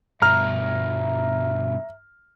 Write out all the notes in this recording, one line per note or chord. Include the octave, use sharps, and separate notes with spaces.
G2 B2 E5 A#5 F6